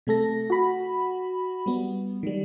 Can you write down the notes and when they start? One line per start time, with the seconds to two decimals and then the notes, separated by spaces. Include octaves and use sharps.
0.07 C3 A3 A4 A#6
0.50 F#4 B5
1.66 G3 B3
2.23 D#3 G3